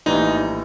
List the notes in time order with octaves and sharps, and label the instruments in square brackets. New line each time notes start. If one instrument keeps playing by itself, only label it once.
[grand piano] A#1 A2 E3 G3 [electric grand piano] D#4